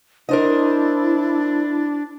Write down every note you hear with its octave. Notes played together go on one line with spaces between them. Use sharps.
D4 E4 A#4 C5 D#5